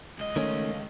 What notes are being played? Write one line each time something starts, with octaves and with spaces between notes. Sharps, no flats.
C#2 D#5
D#3 A3 C#4